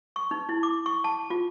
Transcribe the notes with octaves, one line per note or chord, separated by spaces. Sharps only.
C#6
D#4
E4
D6
C#6
A5
F4